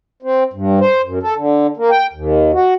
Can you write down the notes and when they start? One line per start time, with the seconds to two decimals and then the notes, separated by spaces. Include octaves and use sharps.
0.22 C4
0.53 G2
0.81 C5
1.04 F#2
1.23 A4
1.36 D3
1.77 A#3
1.91 G5
2.13 D#2
2.53 F#4